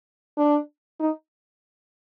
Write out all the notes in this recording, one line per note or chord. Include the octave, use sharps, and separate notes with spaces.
D4
D#4